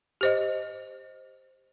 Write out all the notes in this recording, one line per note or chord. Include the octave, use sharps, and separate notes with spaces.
G4 C5 D#5